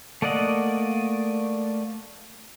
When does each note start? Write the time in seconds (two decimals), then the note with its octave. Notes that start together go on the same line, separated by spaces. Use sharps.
0.22 A3 A#3 D5 D#5 F#5